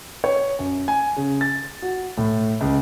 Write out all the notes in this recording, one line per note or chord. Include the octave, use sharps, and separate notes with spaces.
C#5
F#2
G#5
C#3
A6
F#4
A2
C#2